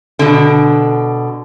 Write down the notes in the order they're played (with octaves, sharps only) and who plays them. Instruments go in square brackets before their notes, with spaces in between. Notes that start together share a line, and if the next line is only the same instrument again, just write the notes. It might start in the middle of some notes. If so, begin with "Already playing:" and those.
[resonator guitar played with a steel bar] B2 D3